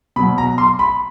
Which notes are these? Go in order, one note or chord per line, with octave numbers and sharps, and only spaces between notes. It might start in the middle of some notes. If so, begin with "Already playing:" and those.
B2 F#3 B5
A#5
C6
B5